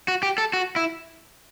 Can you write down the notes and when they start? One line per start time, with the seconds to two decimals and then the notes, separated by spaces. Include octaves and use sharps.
0.08 F#4
0.23 G4
0.38 A4
0.53 F#4
0.76 E4